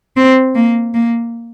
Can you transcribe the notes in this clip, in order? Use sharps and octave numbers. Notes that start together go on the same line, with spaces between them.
C4
A#3
A#3